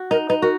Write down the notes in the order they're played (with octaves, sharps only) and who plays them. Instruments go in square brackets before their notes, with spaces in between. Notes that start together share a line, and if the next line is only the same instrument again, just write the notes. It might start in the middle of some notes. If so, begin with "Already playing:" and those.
Already playing: [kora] F#4
[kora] D#4 [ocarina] A#4
[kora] D#4 [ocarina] B4
[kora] F#4 [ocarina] A#4